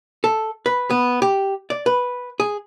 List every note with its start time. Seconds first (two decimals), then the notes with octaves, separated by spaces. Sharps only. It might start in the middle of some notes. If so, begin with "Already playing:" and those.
0.24 A4
0.66 B4
0.90 B3
1.22 G4
1.70 D5
1.86 B4
2.40 G#4